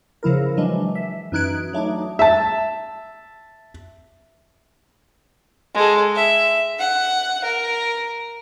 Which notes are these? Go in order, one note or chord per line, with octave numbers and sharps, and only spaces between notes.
C#3 F3 E4 A#4
E3 F#3 G#3 D4
E5
F#2 E3 D#4 F#6 G#6 D7
F#3 A3 D4 D#4
E5 A5
G#3 A4
E5
F#5
A#4